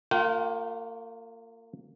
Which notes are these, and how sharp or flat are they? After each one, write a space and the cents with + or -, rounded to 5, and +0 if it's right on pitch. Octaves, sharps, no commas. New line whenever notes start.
A#3 -35 F4 +15 G5 -35